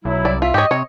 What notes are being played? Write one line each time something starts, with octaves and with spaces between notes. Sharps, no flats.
B1 F#3 E4
C2 D5
F4 E5
G#2 G4 C#5 D#5
C3 C#5